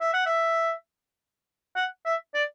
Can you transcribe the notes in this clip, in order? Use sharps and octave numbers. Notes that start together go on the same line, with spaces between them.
E5
F#5
E5
F#5
E5
D5